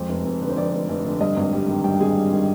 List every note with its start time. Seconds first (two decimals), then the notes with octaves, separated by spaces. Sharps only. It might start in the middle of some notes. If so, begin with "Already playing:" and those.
Already playing: F2 G#3 C5
0.09 F1
0.24 F1
0.41 D3 B4
0.49 C5
0.57 F2 D5
0.73 F1
0.89 F1
1.05 D3
1.21 G2 D#5
1.37 G#1
1.53 G3
1.68 D#3
1.84 G2 G5
2.00 G#1 G#4
2.16 G3
2.32 D#3